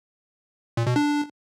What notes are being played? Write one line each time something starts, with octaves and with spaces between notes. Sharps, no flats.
A#2
B2
D4